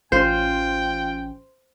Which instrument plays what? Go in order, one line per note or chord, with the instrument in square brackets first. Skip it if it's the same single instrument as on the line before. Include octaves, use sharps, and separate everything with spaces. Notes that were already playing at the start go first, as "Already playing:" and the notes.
[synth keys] A1 C#4 [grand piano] F4 [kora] C5 [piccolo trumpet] G5